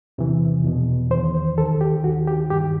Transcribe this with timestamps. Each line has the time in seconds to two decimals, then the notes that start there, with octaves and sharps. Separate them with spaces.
0.18 E2 C3 E3
0.64 E2 B2
1.11 E2 D#3 C5
1.58 D#2 D#3 A4
1.81 G4
2.04 D#3 F#4
2.07 D#2
2.28 G4
2.50 G2 D#3 G4